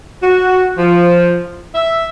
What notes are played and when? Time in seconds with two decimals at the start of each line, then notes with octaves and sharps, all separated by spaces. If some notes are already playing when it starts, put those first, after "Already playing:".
0.22 F#4
0.76 F3
1.75 E5